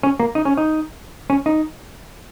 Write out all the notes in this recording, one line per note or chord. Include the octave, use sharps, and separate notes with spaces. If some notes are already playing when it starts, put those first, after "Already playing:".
C#4
A#3
D#4
C#4
D#4
C#4
D#4